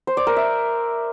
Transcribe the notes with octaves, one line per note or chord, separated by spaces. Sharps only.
C5
D5
A#4
E5